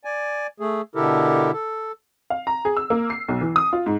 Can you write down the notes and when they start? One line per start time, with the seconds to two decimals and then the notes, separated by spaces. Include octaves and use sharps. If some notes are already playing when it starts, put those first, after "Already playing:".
0.05 D5 G#5
0.60 A3 G#4
0.95 B2 D3 E4 G4 A4 A#4
1.53 A4
2.30 F5
2.47 A#5
2.65 G#4
2.77 E6
2.90 A#3
3.10 C7
3.28 B1
3.41 E3
3.56 D#6
3.73 F4
3.86 G#2